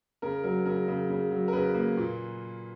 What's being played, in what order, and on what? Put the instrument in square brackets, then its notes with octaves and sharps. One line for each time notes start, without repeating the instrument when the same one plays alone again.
[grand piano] C#3 A#4
F#3 A#4
C#3 A#4
C#3
C#3
F#3
A#4
C#3 B4
A#3
A#2